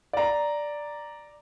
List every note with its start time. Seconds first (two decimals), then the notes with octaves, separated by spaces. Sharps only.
0.13 D5 A#5